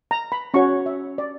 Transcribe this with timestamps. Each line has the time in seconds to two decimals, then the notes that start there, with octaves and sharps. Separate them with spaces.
0.11 A#5
0.32 B5
0.54 C#4 F#4 C#5 C#6
0.86 E5
1.18 D5